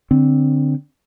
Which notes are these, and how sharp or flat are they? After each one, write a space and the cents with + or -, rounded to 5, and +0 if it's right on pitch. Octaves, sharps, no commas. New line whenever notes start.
D3 +0 C4 +0